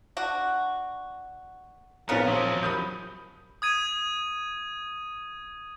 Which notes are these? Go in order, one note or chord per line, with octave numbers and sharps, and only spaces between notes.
D4 F#4
A#1 C#3 B3 C4 A#4 C#5
F3 F#3
B5 D#6 G6
D#6 G#6 D#7